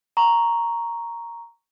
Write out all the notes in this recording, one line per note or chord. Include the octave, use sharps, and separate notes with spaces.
A#5 C#6